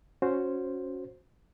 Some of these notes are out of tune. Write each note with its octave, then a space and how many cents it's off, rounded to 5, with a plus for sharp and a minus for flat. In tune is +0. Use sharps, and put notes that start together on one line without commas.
C#4 +0 F#4 -15 C5 +0